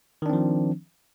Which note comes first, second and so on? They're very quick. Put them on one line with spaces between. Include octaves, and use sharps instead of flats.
D#3 D4 C4 F3